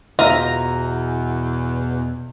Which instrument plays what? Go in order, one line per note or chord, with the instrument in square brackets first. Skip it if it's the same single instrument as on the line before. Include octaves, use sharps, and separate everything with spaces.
[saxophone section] E2 [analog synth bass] B2 [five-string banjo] F4 D#5 E5 [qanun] A#5